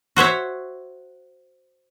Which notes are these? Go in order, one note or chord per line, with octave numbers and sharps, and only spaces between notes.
F#4 C5 C#5 E5